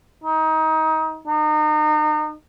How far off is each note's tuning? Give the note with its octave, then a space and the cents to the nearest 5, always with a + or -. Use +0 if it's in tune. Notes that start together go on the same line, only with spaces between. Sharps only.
D#4 +25
D#4 -35